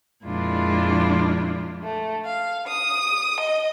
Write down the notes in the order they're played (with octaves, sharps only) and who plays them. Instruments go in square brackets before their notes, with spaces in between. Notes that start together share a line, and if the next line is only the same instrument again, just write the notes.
[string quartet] F2 A#2 G#3 D4 E4 F4
[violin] A3
F5
D#6
D#5